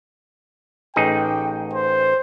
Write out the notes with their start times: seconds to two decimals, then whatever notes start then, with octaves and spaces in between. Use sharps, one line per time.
0.96 A1 D#4 G#4 G5
1.73 C5